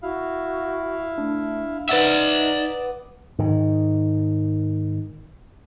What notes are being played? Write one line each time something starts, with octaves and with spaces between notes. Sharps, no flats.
E4 F#4 F5
A3 D4
D#4 B4 D5 E5 F#5 D6 D#6
G#2 D#3